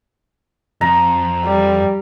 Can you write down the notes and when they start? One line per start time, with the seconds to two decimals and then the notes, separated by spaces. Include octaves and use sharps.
0.81 F2 A#5
1.44 G3